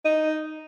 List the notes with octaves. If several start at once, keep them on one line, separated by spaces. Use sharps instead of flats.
D#4